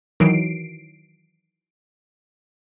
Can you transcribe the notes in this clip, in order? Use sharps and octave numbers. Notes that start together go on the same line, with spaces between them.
D#3 E3 F#3 C7 D7